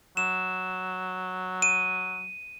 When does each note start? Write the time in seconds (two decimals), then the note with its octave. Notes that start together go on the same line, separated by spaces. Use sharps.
0.17 F#3 E7
1.62 D#7